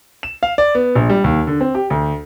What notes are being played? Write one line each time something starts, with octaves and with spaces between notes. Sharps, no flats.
E7
F5
D5
B3
A#1
G3
D#2
D3
C4
G4
D2